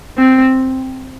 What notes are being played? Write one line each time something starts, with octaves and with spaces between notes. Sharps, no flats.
C4